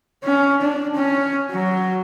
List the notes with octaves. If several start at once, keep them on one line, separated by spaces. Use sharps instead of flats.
C#4
D4
C#4
F#3